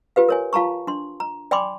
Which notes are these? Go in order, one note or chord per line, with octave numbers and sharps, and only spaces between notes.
F4 G4 B4 F5
A#4 C#5 G#5
F4 F5 A5 A#5 C#6
D4 C6
A#5
D5 G5 G#5 B5 C6 D6